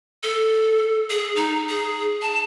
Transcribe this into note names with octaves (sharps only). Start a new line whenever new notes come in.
A4
G#4
D#4
G#4
A5